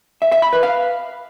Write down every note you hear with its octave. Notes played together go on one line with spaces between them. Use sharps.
E5
E5
B5
B4
F5